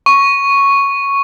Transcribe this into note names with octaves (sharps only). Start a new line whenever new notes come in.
C#6